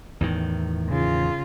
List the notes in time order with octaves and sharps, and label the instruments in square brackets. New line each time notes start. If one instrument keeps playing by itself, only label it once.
[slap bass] E2 A2 D#3
[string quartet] C#3 F4